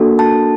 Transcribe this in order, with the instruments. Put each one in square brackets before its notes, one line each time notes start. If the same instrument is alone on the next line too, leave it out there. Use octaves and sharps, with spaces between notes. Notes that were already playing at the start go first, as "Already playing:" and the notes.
Already playing: [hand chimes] A#3 D4 F#4 A4
A5